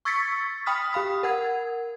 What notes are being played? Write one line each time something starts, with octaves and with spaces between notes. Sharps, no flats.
C#6 E6 G#6 A6 B6 C#7
G5 B5 D#6 F6 B6
G4 F5 B5 D#6
A#4 F#5 G#6